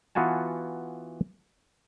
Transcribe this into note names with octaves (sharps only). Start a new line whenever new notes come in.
E3 B3 F4 F#4 G#5 A5